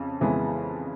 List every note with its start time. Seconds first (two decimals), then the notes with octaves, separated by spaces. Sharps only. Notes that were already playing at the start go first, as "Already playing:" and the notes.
Already playing: F2 C#3
0.21 F2 C#3 E3 G#3 B3